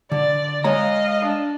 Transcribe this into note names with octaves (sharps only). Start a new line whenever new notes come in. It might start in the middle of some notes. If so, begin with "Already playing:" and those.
D3 D5
G#3 C#5 D#5 F5 A#5
D4